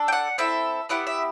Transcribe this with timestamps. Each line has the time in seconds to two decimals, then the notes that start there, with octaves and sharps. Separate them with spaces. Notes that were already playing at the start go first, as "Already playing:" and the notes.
Already playing: D4 A4
0.08 G5
0.12 F#5
0.38 C4 E4 A4 E5
0.89 B3 E4 G4 F#5
1.07 E5